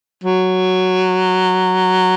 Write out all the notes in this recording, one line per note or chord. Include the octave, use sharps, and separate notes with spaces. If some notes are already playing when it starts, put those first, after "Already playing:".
F#3